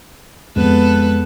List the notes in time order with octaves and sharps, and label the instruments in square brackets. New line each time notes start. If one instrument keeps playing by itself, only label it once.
[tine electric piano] F2 G#3 [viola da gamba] B3 A4 B4